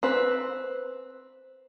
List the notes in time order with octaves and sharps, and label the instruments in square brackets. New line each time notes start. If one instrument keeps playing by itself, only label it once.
[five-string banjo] C4 B4